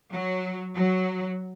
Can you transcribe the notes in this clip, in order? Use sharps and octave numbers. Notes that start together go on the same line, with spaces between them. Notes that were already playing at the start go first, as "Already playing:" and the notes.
F#3
F#3